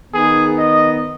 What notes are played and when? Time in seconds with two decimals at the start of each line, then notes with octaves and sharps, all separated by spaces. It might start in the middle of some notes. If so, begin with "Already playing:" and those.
0.12 D#3 B3 D#4 G#4
0.57 D#5